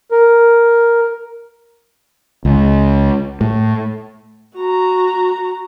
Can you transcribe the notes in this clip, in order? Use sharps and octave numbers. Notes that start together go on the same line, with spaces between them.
A#4
C#2
A2
F#4 A#5